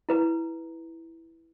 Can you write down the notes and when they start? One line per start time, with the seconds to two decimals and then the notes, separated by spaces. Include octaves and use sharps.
0.09 E4 B4 A#5